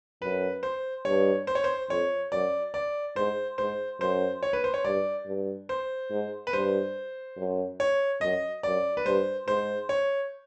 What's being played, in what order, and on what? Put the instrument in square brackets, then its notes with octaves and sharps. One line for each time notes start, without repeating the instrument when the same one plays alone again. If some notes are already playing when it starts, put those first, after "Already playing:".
[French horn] F#2 [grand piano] B4
[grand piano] C5
[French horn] G2 [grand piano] C#5
[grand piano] C5
C#5
C5
[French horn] F2 [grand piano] C#5
[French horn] F#2 [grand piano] D5
[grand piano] D5
[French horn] G#2 [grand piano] C5
[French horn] G#2 [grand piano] C5
[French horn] F#2 [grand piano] C5
[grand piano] C#5
B4
C5
C#5
[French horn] G2 [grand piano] D5
[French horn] G2
[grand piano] C5
[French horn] G#2
[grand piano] B4
[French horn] G2 [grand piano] C5
[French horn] F#2
[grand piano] C#5
[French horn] F#2 [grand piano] D#5
[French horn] F#2 [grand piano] D5
[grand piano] B4
[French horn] G2 [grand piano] C5
[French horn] G#2 [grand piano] C5
[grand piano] C#5